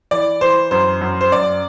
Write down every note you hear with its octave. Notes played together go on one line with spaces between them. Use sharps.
E3 D5
E3 C5
F#2 C5
F#2
C5
F#2 D5